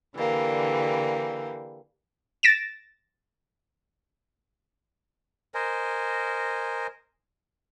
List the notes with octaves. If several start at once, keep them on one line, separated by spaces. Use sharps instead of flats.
D3 E3 G3 A#3
A6 A#6 D7 E7
A#4 C5 D#5 G#5